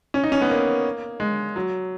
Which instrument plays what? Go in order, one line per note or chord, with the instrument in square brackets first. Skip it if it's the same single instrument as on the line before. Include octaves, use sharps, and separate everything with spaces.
[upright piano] C#4
D#4
C#4
B3
A#3
G#3
F#3